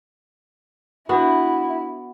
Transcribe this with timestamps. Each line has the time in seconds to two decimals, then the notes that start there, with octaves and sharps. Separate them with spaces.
1.09 B3 D4 E4 F#4 F#5 B5